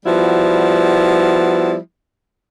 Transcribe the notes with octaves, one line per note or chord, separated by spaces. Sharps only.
F3 G3 B3 E4 F#4